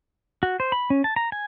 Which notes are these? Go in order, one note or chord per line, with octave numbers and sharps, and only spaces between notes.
F#4
C5
B5
C#4
A5
A#5
G#5